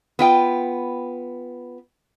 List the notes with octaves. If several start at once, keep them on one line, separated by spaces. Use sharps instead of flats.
B3 F4 G5